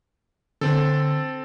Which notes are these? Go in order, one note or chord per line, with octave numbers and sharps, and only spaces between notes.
D3 C4 A4